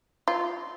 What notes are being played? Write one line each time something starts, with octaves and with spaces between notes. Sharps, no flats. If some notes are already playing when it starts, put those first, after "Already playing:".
F4